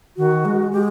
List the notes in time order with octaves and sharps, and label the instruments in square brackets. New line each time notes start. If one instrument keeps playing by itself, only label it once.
[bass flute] D#3 [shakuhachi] F#4
[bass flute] G#3
[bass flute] G#3 [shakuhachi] G4